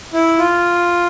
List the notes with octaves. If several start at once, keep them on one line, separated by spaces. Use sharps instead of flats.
E4
F4